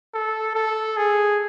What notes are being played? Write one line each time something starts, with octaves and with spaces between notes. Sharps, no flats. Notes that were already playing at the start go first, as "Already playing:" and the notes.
A4
A4
G#4